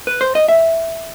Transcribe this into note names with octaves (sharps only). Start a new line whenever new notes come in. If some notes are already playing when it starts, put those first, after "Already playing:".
B4
C5
D#5
E5